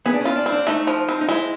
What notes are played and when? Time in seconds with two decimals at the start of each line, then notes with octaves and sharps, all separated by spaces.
0.06 B3 G#4
0.14 D4
0.21 C#4 F4
0.36 D4
0.46 C4
0.52 D4
0.67 A3 D#4
0.87 F3
1.09 C4
1.21 D#4
1.29 G#3 E4